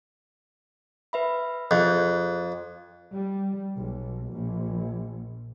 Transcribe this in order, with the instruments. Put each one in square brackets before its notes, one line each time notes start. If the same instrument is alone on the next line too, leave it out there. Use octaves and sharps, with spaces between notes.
[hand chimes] B4 E5 B5
[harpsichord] F2 [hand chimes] G#4 F#6 G6
[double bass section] G3
B1
A#1